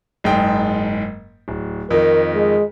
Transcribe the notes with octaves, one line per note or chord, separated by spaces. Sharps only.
F#1 G#2 G5
D1
F2 D#3 A#4
G#3